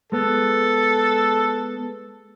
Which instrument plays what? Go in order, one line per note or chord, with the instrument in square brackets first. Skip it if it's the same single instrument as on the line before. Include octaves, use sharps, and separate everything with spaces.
[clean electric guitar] G#3 B3 [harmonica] A4